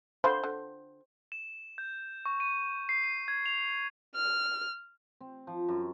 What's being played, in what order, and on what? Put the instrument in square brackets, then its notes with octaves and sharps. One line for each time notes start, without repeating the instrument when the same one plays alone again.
[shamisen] D3 F4 B5 [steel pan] C5
[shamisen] D3
[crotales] E7
G6
C#6
D#7
C7
D#7
G#6
F7
[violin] F6
[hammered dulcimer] C4
F3
F#2